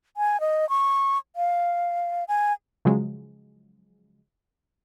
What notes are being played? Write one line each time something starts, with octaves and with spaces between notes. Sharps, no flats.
G#5
D#5
C#6
F5
G#5
C#3 F3 F#3 G#3